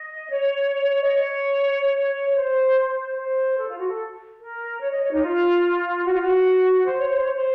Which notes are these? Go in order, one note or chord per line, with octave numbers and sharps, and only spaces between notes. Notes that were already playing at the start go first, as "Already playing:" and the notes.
Already playing: D#5
C#5
D#5
C#5
C#5
C#5
C5
C5
A4
F4
F#4
A4
A#4
C#5
D#5
C#5
D#4
F4
F#4
F4
F#4
C5
C#5
C5
C#5
C5